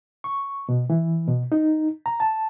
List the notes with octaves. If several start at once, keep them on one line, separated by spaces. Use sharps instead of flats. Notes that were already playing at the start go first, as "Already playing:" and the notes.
C#6
B2
E3
B2
D#4
A#5
A5